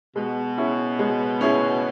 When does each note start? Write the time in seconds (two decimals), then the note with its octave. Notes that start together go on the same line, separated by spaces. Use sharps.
0.16 B2 G#3
0.58 C#4 E4 G#4
0.99 G#3
1.41 C#4 E4 G#4